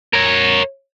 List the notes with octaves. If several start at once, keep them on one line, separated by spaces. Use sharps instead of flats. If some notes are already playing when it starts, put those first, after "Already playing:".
A#4 C#5